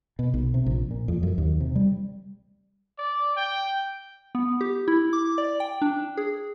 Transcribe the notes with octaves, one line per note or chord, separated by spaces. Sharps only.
B2
B1
C3
A#1
A#2
F2
F#2
D#2
C3
G3
D5
G5
B3
G4
E4
D6
D5
G5
D4
G#4